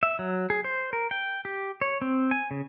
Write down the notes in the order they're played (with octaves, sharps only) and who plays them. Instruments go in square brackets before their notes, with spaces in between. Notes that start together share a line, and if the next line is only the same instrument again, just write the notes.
[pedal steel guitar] E5
F#3
G#4
C5
A#4
G5
G4
C#5
C4
G#5
C#3